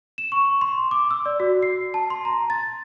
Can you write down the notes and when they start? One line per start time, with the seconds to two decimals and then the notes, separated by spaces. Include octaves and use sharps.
0.18 E7
0.32 C#6
0.61 C6
0.91 D6
1.11 E6
1.26 D5
1.40 F#4
1.63 C7
1.94 A5
2.10 C6
2.25 A#5
2.50 A6